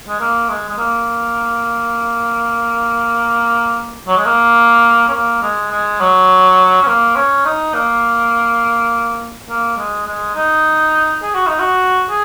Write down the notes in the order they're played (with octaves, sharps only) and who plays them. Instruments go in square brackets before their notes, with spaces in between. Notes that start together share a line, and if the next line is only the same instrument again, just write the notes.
[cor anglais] G#3
A#3
G#3
G#3
A#3
F#3
G#3
A#3
C#4
A#3
G#3
G#3
F#3
C#4
A#3
C#4
D#4
A#3
A#3
G#3
G#3
D#4
G#4
F#4
D#4
F#4
G#4